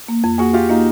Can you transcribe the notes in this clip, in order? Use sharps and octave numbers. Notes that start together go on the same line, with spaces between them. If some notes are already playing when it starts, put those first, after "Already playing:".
A#3
F2
A#3 F#4 G#4
F2 F4 G4
A#3 D#4 F4